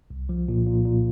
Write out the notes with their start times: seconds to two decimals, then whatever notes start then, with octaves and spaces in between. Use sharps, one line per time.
0.10 C2
0.29 F3
0.49 A#2
0.67 A#2
0.85 A#2